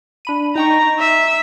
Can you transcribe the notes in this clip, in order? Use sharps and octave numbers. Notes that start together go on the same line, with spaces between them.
D4 B5 D#7
D#4 G5 A#5 C#6
E5